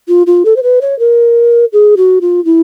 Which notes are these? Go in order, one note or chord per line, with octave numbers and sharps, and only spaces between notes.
F4
F4
A4
C5
B4
C#5
A#4
G#4
F#4
F4
E4